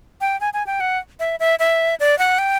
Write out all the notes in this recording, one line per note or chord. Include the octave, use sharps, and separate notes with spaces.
G5
G#5
G#5
G5
F#5
E5
E5
E5
D5
F#5
G5